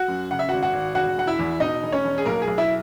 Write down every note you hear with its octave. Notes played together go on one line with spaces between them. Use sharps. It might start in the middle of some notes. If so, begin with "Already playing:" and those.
Already playing: F#4 F#5
F#2
C#3 F#5
E5
G#1 F#4 F#5
F#4 F#5
G#1
E1 F#4 F#5
E1 F#5
E4 E5
E2
B2 D#4 D#5
E1
C#4 C#5
E1
G#4
B1 A#3 A#4
G#4
B1
E4 E5